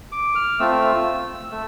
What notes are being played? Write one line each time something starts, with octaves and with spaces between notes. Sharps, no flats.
D6
F6
A3 C4 F4 E6
A3